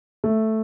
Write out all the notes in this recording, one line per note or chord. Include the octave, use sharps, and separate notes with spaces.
A3